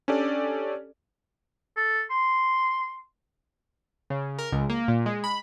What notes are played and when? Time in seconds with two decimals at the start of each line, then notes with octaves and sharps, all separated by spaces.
0.08 C#4 D4 G4 A4 D5
1.77 A4
2.10 C6
4.10 C#3
4.38 A#4
4.52 C#2
4.69 A#3
4.88 A#2
5.06 G#3
5.24 B5